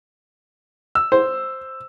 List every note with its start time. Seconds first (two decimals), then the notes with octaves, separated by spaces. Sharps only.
0.95 E6
1.12 C5